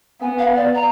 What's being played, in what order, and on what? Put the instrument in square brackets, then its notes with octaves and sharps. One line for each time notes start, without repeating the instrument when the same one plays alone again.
[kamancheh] B3 [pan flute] G#5
[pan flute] F5
D5
A#5